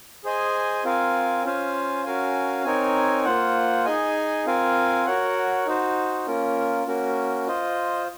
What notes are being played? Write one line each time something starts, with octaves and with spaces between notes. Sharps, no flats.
G#4 C5 D#5 G#5
C4 F4 A#4 F5 G#5
C#4 F4 C5 F5 G#5
C#4 F#4 A#4 F5 G#5
C4 D#4 A#4 C#5 G#5
A#3 F4 C5 F#5
D#4 G#4 D#5 G#5
C4 F4 A#4 F5 G#5
F#4 A#4 C#5 F#5
D#4 F#4 C5
A#3 C#4 F4 A#4
A#3 C#4 F#4 A#4
F4 C5 D#5